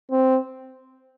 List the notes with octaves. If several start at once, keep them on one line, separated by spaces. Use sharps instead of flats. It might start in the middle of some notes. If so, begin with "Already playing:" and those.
C4